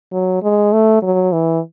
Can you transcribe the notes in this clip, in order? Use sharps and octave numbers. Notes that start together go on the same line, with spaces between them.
F#3
G#3
A3
F#3
E3